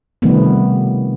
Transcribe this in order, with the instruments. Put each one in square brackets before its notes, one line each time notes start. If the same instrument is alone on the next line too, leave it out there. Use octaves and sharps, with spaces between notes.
[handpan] C3 D#3 F3 G3 A3 B3